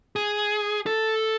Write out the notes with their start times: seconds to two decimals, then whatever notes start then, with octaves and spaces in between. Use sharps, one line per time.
0.16 G#4
0.86 A4